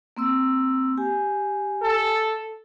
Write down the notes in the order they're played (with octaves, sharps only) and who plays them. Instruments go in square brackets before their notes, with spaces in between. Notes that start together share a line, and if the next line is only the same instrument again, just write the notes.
[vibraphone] A#3 C4 E6
G4 G#5
[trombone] A4